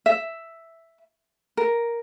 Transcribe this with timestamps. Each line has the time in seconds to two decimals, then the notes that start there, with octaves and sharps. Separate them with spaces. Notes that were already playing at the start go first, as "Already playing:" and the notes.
0.06 E5
1.57 A#4